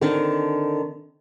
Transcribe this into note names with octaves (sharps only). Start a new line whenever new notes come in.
D3 D#3 C4 D4